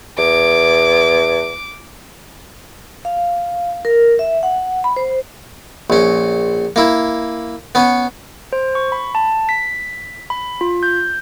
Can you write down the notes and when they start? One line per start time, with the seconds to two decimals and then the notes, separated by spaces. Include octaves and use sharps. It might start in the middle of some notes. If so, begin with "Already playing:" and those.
0.18 E2 D6
3.05 F5
3.85 A#4
4.19 E5
4.43 F#5
4.84 B5
4.96 C5
5.90 A#1 C#4
6.76 A#3 E4
7.75 B3 C#4
8.53 C5
8.75 C#6
8.92 B5
9.15 A5
9.49 B6
10.30 B5
10.61 F4
10.83 G6